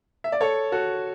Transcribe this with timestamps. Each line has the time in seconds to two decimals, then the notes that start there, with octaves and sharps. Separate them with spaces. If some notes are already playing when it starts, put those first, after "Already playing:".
0.24 E5
0.32 D5
0.41 A4 C#5
0.72 F#4 A4